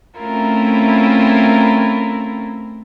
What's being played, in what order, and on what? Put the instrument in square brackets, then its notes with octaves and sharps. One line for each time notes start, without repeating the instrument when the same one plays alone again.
[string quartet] A3 C4 C#4 E4 F4 A#4